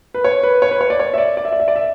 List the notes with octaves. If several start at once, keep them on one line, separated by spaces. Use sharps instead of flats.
B4
C#5
B4
C#5
B4
C#5
D5
C#5
E5
D5
D5
E5
D5
E5
D5
E5